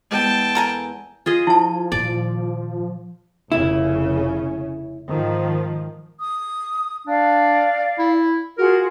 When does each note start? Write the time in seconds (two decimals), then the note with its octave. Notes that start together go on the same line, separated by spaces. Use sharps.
0.11 E2 G#3 G5 A5
0.55 A4 A#4 G#5
1.26 F4 G#4 D#5
1.47 F3 E4 A5
1.92 A#2 D#3 D5
3.52 F1 C#3 C#4 E4
5.10 G#2 D#3 F3
6.18 D#6
7.07 D4 D5 F5
7.99 E4
8.58 F4 F#4 G#4 A#4